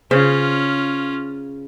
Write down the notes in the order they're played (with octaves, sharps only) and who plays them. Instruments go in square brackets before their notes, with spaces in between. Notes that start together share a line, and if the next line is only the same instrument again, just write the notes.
[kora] C#3 C5 [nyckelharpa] C#4 F4